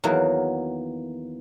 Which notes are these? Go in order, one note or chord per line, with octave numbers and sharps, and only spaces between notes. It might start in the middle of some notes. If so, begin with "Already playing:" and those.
E2 D#3 E3 F#3 A#3